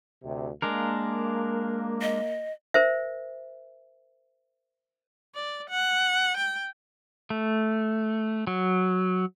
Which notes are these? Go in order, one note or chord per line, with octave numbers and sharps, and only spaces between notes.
D2 C3
G#3 A#3 D4 A#4
D#5
A#4 C5 E5
D5
F#5
G5
A3
F#3